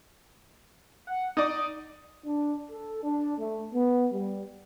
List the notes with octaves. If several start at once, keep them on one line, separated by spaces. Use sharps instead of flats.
F#5
D#4 D5 D#6
D4
A4
D4
A3
B3
G3